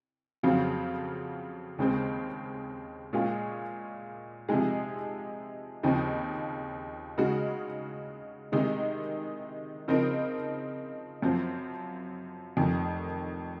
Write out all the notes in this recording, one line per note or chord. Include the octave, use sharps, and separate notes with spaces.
F2 C#3 F#3 C4 F4
D#2 C#3 G#3 C4
A#2 G#3 C#4 F4 G#4
C3 F3 G#3 D#4 G#4
D#2 C#3 F3 C4 D#4
C#3 G#3 D#4 F#4
C3 D#3 G#3 D#4
C#3 F3 C4 D#4 A#4
F#2 F3 C4
F1 F2 D#3